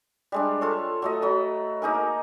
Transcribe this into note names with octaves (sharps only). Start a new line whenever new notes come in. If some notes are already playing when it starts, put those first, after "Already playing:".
G3 G#3 D4
F4 A4 C#5
F#3 A3 D#5
F#3 B5
A#3 D#4 G#4 A#4